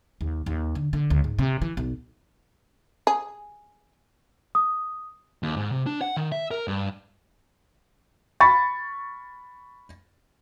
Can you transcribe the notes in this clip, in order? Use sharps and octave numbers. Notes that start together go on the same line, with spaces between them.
D#2
D#2
D3
D3
C#2
G#2
C3
E3
B1
G#4
D#6
D#2
G#2
C3
D4
F#5
D#3
E5
A#4
G2
B5 C#6 A6